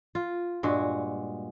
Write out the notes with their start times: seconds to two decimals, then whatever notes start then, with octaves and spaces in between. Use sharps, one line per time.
0.15 F4
0.63 G2 A#2 G#3 F#4